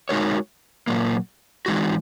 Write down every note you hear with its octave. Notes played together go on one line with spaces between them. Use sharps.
G#3 D#4 F#4 A#4 C#5
A#2 F#3 A#3
E3 G#3 D#4 F#4